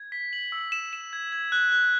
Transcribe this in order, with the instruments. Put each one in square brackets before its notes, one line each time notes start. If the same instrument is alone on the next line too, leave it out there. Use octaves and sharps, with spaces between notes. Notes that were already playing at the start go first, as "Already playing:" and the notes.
Already playing: [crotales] G#6
B6
F#7
E6
E7
E7
G#6
G#6
F#6
F#6